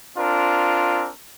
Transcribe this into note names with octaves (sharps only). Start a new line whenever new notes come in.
C4 D4 F4 A#4